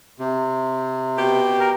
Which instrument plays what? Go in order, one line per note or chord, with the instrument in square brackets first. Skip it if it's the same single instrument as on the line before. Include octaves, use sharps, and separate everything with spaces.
[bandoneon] C3
[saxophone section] B2 G4
[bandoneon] A#4